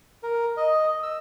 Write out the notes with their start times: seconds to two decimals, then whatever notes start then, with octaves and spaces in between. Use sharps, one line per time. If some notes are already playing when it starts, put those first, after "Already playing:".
0.23 A#4
0.57 D#5
1.03 E6